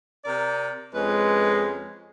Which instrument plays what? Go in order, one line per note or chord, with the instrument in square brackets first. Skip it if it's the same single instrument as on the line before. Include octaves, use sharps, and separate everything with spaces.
[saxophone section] C3 A#4 D5
[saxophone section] F2 C#4 B4 [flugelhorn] G#3